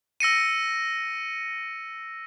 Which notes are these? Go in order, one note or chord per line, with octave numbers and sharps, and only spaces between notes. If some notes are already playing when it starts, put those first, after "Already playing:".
E6 A#6 C#7 D#7